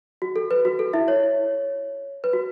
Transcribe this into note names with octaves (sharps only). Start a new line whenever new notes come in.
F#4
A4
B4
F#4
A4
E4 E5
C#5
B4
F#4